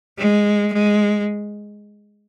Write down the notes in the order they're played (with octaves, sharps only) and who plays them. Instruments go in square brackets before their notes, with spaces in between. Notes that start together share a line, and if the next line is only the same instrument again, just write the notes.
[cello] G#3
G#3